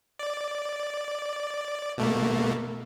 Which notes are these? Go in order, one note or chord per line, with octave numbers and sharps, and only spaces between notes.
D5
B2 A3 A#3